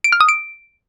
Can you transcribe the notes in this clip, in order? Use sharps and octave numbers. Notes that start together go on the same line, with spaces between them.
D7
F6
D#6
D7